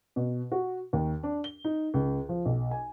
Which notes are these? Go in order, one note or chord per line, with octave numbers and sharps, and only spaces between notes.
B2
F#4
D#2
D4
G7
D#4
C#2
F3
B1
G#5